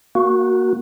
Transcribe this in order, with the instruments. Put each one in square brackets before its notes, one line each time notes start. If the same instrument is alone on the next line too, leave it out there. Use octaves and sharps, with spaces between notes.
[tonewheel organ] A#3 F#4